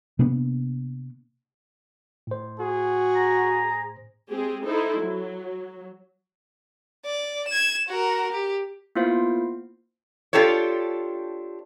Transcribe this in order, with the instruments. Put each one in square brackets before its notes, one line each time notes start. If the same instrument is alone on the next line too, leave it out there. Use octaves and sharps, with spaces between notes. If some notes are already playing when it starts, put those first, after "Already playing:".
[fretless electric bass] C3 A#3 B3 D4
[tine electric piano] A2 C5
[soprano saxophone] F#4 [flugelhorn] G#4
[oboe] A#5
[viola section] G#3 C4 G4 G#4
D#4 E4 A4 C5
F#3
[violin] D5
G#6 E7
F#4 A#4
G4
[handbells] A#3 B3 E4 F4 C5 F5
[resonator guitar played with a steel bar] D4 F4 G4 A4 C5 C#5